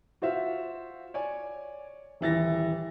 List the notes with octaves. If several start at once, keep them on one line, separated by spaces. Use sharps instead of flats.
F4 F#4 C5 E5 F5
C#5 D5 G#5
D#1 E3 A6 A#6